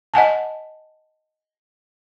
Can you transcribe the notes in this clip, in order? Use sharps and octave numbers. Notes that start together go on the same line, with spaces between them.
D#5 F#5 G#5 A5